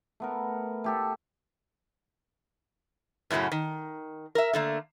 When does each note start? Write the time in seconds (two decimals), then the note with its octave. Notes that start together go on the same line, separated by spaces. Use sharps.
0.20 A3 B3 A#4
0.84 A3 G4 A4
3.30 F#2 A2 C#3 F#3 C#4
3.52 D#3
4.35 A#4 E5
4.53 D3 A3 A#3